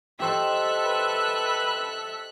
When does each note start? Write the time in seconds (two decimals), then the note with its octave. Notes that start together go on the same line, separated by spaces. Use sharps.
0.20 G4 A4 C5 D#5 E5 F#6 B6
0.85 B4